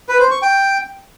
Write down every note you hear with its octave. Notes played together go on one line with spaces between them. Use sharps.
B4
C5
C#6
G5